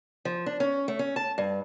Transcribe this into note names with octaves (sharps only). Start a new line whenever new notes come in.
F3
D4
C#4
A3
C#4
A5
G2